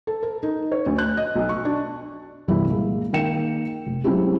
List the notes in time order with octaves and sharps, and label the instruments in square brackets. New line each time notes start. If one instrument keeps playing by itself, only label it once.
[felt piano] A4
A#4
D#4
C#5
D2
F#6
D#5
B1
C#6
D4
C2 G2 E3 B3 E4 G4
A#2 G#3 A#3
D#3 A#3 A#4 G5 C#7 E7
F1
F#3 G#3 C4 C#4 E4 G4